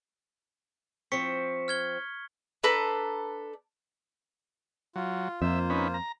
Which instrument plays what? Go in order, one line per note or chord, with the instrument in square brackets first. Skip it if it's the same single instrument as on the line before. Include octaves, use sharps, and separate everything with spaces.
[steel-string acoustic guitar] F3 C4 [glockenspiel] C#6 B6 C#7
[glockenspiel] F6 G#6 G7
[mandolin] D4 A4 B4 A#5
[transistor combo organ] F#3 [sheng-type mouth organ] F4
[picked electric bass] F2 [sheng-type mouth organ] A#3 F4 C5 [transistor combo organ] E5
[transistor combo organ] C#4 D#4 B4
A#5